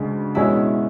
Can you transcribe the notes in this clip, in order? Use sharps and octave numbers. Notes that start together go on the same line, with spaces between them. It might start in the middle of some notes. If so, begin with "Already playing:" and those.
Already playing: D2 C#3 G#3 D4
E2 B2 G#3 C#4 E4